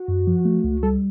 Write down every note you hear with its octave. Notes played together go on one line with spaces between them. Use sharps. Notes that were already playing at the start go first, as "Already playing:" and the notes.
Already playing: F#4
F#2
F3
A3
C#2
G3 A4